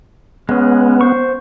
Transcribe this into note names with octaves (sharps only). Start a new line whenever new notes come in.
G#3 B3 C#4
C5 C#6